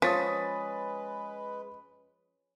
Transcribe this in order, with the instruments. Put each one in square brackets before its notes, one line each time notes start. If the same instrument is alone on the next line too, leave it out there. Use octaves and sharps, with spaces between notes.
[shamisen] F3 [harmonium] G#3 B4 [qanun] C#4 [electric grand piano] D#6 A6 B6